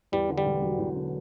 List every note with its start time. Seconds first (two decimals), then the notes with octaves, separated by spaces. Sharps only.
0.12 E2 G3
0.29 D3
0.38 G3
0.45 E1
0.62 F#3
0.79 E2
0.96 D3